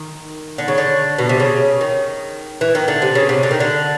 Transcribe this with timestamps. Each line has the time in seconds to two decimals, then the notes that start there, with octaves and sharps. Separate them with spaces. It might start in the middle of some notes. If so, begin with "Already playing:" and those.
Already playing: D#3
0.58 D3
0.68 C#3
0.78 D3
1.18 B2
1.29 C3
1.40 C#3
1.81 D#3
2.61 E3
2.75 D#3
2.88 D3
3.02 C3
3.15 C#3
3.29 C3
3.43 D3
3.51 D#3
3.60 D3